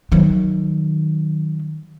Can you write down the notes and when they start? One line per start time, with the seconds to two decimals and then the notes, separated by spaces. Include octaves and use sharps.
0.12 D#3 F#3